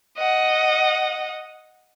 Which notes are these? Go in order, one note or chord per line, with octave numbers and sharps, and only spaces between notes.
D#5 F#5